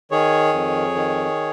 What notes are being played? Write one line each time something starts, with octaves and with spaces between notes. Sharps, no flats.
D#3 G#4 C#5
F2
D#3